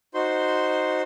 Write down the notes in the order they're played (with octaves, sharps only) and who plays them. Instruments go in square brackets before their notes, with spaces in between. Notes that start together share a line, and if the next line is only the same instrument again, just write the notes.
[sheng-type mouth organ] D#4 F#4 C5 C6